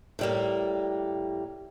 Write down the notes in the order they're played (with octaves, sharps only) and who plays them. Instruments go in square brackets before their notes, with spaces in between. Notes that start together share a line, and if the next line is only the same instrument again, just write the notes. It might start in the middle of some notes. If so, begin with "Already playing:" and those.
[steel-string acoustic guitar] A2 G3 A#3